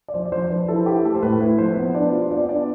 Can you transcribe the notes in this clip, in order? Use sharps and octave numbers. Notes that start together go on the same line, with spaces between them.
D5
F3 C5
D5
F3 C5
F3 B4
E4 A4
E4 G4
A3 A4
C5
A2 B4
E4 B4
F3 C5
B3
D4 D5
F4
B3 D5
D4 D5